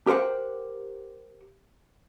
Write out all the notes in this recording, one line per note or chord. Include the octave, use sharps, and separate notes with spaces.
G4 A#4 C5 F#5 G5